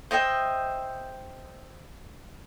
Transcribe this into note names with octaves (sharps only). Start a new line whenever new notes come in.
C5 D#5 E5 G5